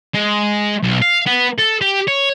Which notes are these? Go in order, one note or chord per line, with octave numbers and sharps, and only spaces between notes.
G#3
B1
F5
B3
A4
G4
C#5